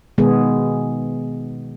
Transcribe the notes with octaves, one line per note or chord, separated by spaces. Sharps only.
B2 D#3 G#3 B3 G#4